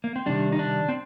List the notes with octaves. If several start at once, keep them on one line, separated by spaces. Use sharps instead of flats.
A#3
C4
C3 D#3 G3 D4
D#4
D4
C4